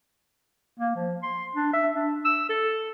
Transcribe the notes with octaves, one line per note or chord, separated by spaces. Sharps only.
A#3
F3
C6
D4
E5
D4
E6
A4